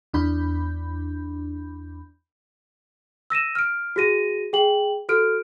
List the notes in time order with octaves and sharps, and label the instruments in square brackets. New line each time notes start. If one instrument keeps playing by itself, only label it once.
[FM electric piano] E2 D4 B5 G6
[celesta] E6 A#6 D#7 E7
F6 D7
F#4 G#4 A#6 D#7
G#4 G5 F#7
F#4 A4 F6 D7